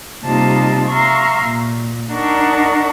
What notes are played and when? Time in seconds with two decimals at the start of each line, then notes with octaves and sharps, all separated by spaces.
0.23 C3 G3 A#3 D#4 F4 A5
0.89 E5 F5 A#5 C6 C#6
1.42 A#2
2.11 D4 D#4 A#4 F#5 A5 C#6